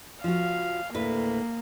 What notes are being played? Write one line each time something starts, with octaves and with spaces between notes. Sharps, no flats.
F3 F#4 F5
D2 A2 A#3 B4